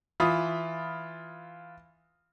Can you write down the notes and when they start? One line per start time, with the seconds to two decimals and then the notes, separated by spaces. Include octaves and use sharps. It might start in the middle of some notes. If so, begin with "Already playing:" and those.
0.20 E3 F4 B5 D#6